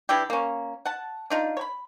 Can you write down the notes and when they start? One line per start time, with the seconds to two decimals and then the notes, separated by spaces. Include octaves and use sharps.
0.09 E3 D4 E4 G4
0.30 A#3 C#4
0.86 F#5 A5
1.30 D4 D#4 F4
1.57 C#5 B5